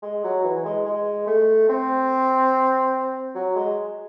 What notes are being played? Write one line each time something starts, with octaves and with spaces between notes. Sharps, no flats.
G#3
F#3
E3
G#3
G#3
A3
C4
F#3
G#3